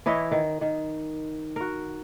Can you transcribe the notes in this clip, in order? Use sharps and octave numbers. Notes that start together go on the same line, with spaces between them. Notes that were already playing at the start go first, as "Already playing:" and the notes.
E3 E4 C#5 D#5
D#3
D#3
F#4 A#4